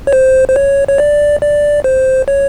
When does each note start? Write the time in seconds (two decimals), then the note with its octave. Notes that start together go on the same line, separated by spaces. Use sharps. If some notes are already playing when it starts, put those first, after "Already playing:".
0.07 C#5
0.13 C5
0.49 C5
0.56 C#5
0.88 C#5
0.98 D5
1.42 D5
1.84 C5
2.28 C#5